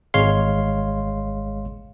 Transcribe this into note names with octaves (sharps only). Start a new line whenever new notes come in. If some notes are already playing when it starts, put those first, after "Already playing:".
G#1 G#3 C#5 F5 C6